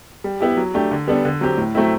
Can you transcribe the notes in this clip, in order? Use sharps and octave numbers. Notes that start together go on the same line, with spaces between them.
G3
B3 E4 G4
F#3
A3 D4 G4
D3
G3 B3 D4 A4
D3
F#3 C4 G4
A2
F#3 A3 C4 E4